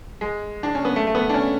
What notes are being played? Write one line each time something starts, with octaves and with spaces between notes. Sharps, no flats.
G#3
D4
C#4
B3
A3
A3
B3
D4
C#4